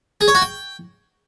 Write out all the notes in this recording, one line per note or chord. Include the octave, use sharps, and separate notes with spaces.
G#4
C#5
F#4
G5